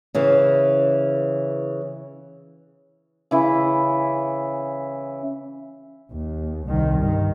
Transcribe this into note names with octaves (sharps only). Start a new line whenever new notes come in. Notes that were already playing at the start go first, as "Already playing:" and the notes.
C#3 E3
C#3 E3 E4
D#2
C2 D#3
G2 D#3